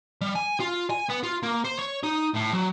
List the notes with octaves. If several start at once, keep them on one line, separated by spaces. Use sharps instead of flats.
G3
G#5
F4
G#5
B3
F4
A#3
C5
C#5
D#4
A2
F#3